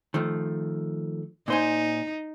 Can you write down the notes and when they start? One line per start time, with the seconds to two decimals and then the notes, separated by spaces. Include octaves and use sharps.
0.14 D#3 F3 A3
1.48 A#2 D#4 C5 G#5